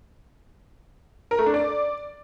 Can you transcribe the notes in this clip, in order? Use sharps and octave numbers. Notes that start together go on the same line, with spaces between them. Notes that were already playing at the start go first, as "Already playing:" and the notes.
A#4
A3
D4
D5